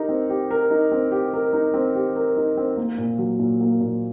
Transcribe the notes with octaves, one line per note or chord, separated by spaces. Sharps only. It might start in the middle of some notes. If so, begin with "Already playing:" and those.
Already playing: D#4 G4 A#4
C4
G4
A#4
D#4
C4
G4
A#4
D#4
C4
G4
A#4
D#4
C4
A#3
A#2
F#3
A#2
A#3
A#2